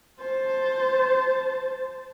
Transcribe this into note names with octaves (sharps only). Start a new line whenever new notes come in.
C5 A5